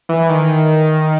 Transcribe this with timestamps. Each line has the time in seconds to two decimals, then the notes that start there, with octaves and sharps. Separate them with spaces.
0.09 E3
0.29 D#3